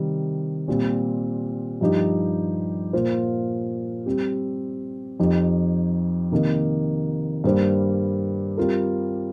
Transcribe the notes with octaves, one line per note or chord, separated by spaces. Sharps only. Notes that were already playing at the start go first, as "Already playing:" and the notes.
Already playing: C3 D#3 G3 C4
A#2 G3 C4
G2 F3 D#4 G4
A#2 A#3 F4 C5
G3 C4 G4
F2 F3 D#4 G4
C3 D#3 A#3 D#4
G2 G3 A#3 G4 C5
G3 C4 F4 A#4